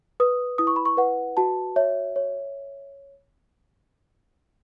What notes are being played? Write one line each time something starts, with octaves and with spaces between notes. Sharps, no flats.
B4 D#6
E4 D#6
C#6
B5
C#6
B4 F#5
F#4 A5
C#5 E5
C#5